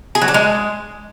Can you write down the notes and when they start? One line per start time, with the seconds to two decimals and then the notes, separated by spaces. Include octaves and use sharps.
0.15 G#4
0.21 F#3
0.28 D4
0.34 G#3